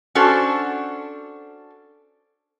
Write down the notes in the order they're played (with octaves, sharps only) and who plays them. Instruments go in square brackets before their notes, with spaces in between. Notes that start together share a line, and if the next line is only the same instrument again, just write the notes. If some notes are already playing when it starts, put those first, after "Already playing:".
[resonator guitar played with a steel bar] C#4 D4 F#4 A4 C5